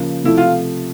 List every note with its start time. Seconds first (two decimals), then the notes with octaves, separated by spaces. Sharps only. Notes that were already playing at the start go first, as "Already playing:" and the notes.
Already playing: C#3 F3 A#3
0.24 C3 F3 A3 E4
0.37 F4